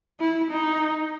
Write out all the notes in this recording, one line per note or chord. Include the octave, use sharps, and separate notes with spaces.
E4
D#4